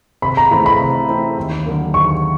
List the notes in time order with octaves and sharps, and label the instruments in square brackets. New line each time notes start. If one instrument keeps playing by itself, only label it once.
[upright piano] C3 [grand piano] B5
[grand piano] A#5
[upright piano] E3 A3 C4 [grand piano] B5
[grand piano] B5
[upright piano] C3
E3 A3 C4
D#2
D3 F#3 A#3
[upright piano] D#2 [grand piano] C#6